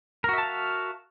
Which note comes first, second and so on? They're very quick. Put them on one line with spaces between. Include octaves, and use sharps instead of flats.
A#4 F#4 E5 A5 F5